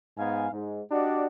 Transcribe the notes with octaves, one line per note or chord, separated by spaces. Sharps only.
G#2 B3 F5 G#5
G#2
D4 F#4 G4 D5 D#5